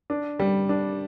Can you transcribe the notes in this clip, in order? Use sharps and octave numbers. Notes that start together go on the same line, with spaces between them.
D4
G3
D4